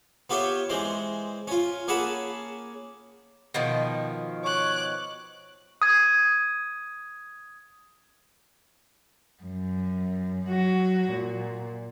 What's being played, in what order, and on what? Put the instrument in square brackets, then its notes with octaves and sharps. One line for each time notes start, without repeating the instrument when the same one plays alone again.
[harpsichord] B3 F4 G4 C#5 E5
E3 G#3 C4
C#4 F4
A#3 C#4 G#4 F#5 A5 B5
[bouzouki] B2 D#3 F3
[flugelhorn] C#5 [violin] D6 F#6
[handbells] D#6 G#6
[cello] F#2
F#3 F#4
A#2